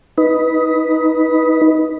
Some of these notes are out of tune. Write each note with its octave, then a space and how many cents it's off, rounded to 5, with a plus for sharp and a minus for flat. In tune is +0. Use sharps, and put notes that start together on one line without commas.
D#4 +15 B4 -5